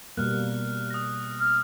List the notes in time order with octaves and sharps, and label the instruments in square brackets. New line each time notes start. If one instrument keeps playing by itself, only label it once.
[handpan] B2 G3 A#3 [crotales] F6 F#6
[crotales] D#6 A#6
[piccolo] F6